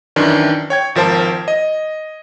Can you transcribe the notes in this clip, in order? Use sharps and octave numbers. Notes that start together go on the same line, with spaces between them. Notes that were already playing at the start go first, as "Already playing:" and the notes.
F#2 D#3 E3 D4
C#5 G5 G#6
G#1 F3 A#4 C5 A5
D#5